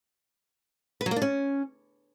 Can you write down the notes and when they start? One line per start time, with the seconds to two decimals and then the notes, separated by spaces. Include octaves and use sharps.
1.01 B4
1.06 F#3
1.11 A#3
1.16 D4
1.22 C#4